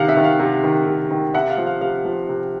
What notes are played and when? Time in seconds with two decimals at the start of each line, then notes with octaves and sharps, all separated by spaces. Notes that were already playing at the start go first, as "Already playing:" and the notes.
Already playing: C3 D#3 F5 F#5
0.09 E5
0.17 D#3
0.24 F5
0.39 C3
0.64 D#3
0.87 C3
1.11 D#3
1.34 C3 E5 F#5
1.50 F5
1.58 F3
1.66 F5
1.81 C3 F5
2.05 F3
2.29 C3